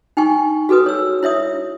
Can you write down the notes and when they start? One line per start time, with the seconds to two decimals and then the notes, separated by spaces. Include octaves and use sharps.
0.17 D#4 G5 G#5 C#6
0.69 F#4 G#4 A4 B4 D#6
0.86 C#5 E6
1.23 E4 C#5 E5 D#6